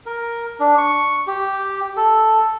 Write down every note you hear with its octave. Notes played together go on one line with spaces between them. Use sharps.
A#4
D4
C#6
G4
A4